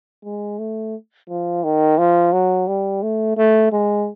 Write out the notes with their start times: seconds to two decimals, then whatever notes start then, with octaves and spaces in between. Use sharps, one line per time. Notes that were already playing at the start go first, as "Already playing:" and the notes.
0.24 G#3
0.59 A3
1.29 F3
1.64 D#3
1.98 F3
2.33 F#3
2.68 G3
3.03 A3
3.37 A3
3.72 G#3